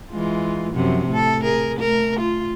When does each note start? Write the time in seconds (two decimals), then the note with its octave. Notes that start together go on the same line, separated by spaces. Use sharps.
0.10 E3 G#3 F4
0.73 F#2 C3 F3
1.09 A2 A4
1.41 G#4 A#4
1.79 A3 A#4
2.20 F4